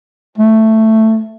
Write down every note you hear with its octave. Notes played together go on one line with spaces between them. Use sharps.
A3